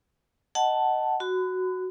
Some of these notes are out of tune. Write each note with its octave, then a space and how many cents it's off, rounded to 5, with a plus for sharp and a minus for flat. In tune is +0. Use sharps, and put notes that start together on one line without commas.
D#5 +0 F#5 +15 A5 +0
F#4 +0 B5 +40